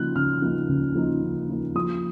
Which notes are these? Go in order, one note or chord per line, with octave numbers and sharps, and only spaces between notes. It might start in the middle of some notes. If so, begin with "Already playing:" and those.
Already playing: C#3 F3 A#3 D#4 F#6
C#3 F6
F3 A#3 D#4
C#3
F3 A#3 D#4
C#3
F3 A#3 D#4
F3 D#6